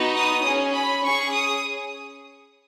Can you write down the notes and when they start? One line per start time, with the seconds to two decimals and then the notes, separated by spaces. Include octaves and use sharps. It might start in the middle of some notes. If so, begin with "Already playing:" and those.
Already playing: B3 D#4 F#4
0.16 D#6
0.45 C#4 G#4
0.74 B5
1.04 C#4 G#4 C#6
1.34 D#6